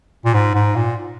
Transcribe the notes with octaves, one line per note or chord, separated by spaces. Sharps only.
A#2
G#2
G#2
A#2